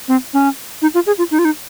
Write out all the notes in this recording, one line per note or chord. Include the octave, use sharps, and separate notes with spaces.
C4
C#4
D#4
F4
G#4
F4
D#4
F4
D#4